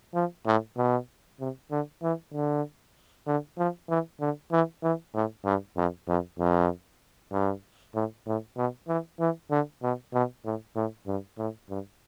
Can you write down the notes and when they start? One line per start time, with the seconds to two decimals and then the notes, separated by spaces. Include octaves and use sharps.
0.15 F3
0.46 A2
0.77 B2
1.40 C3
1.71 D3
2.02 E3
2.34 D3
3.27 D3
3.58 F3
3.89 E3
4.20 D3
4.52 E3
4.83 E3
5.14 A2
5.45 G2
5.77 F2
6.08 F2
6.39 F2
7.32 G2
7.95 A2
8.27 A2
8.57 B2
8.88 E3
9.20 E3
9.51 D3
9.83 B2
10.13 B2
10.45 A2
10.76 A2
11.07 G2
11.38 A2
11.70 G2